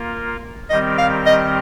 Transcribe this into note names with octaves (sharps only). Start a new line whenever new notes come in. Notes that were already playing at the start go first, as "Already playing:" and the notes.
Already playing: A#3 F4 A#4
D#3 G3 C4 G4 A#4 D#5
F5
D#5